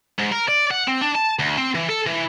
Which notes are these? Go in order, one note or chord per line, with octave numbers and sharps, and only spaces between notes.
G#2
A#4
D5
F#5
C4
D4
A5
D2
C4
E3
A4
E3